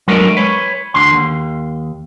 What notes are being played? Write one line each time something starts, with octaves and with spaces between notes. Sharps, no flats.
F#3 G#3 A3 D4 A#4 B4
B4 C#5
D2 D3 C6
D#2